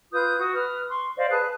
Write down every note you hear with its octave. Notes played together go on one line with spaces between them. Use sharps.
F4 B4 D#6 G6
F#4 D#6
B4 D#6 F6
C6 C#6
C5 D5 D#5 F5
G#4 B4 A5 F#6